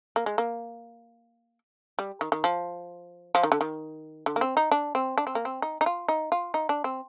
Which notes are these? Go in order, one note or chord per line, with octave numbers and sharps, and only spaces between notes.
A#3
G#3
A#3
G3
D#3
D#3
F3
F3
D#3
D3
D#3
D3
A#3
C4
D#4
D4
C4
D4
C4
A#3
C4
D#4
D#4
F4
D#4
F4
D#4
D4
C4